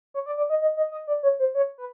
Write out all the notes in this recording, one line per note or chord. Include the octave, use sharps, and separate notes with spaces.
C#5
D5
D5
D#5
D#5
D#5
D#5
D5
C#5
C5
C#5
B4